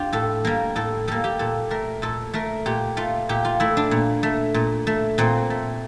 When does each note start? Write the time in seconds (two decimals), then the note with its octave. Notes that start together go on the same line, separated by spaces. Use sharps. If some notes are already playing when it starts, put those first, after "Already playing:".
Already playing: D4 F4 G4
0.13 A2 A4
0.45 G3 A#3 A#4
0.76 A2 A4
1.08 G3 A#3 A4
1.24 G4
1.39 A#2 A4
1.71 A3 A#4
2.02 A#2 A4
2.34 A3 A#4
2.66 A#2 G4
2.97 A3 F4
3.29 A#2 G4
3.45 F4
3.60 A3 E4
3.77 D4
3.91 A#2
4.23 A3
4.54 A#2
4.87 A3
5.18 A#2 C4
5.50 A3